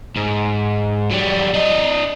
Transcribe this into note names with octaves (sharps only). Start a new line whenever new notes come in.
G#2
F#3 G3
D4 D#5